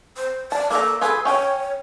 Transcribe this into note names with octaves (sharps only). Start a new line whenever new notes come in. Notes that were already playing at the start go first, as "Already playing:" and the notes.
C5
D5 A5
A#3 A4 D5 A#5
F4 G#4 A4 B4
C#4 C#5 G5